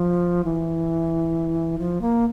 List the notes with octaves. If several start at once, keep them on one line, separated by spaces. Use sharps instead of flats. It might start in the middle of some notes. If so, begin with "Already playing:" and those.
Already playing: F3
E3
F3
A#3